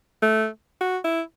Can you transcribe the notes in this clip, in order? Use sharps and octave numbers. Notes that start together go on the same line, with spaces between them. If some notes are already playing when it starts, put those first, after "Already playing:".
A3
F#4
E4